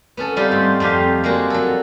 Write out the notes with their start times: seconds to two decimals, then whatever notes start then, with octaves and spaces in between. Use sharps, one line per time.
0.17 B3 C#4 A4
0.36 G3 C4 D#4 F4 G4 A4
0.51 G#2 A3
0.80 F2 F4 G4 D#5 F5
1.24 G#3 A#3 D4 F#4
1.50 F#3 A4